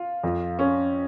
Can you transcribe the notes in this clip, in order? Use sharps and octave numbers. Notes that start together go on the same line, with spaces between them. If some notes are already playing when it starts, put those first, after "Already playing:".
Already playing: F4
F2 F3
C#4